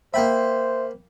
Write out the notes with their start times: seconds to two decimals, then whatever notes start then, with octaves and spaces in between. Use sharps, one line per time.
0.14 A#3 C5 E5 G5 B5